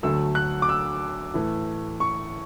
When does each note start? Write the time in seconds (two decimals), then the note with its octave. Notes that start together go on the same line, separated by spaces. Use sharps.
0.03 D2 D3 F#3 A3 E6
0.35 F#6
0.62 D6
0.69 E6
1.34 A2 E3 A3
2.00 C#6